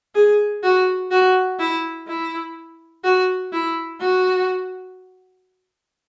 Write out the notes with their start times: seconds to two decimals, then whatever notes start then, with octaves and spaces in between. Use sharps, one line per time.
0.15 G#4
0.63 F#4
1.11 F#4
1.59 E4
2.08 E4
3.04 F#4
3.52 E4
4.00 F#4